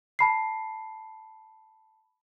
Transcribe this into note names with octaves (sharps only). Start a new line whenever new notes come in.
A5 B5 C7